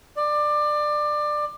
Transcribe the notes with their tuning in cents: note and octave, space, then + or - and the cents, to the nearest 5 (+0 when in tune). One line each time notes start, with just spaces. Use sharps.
D5 +20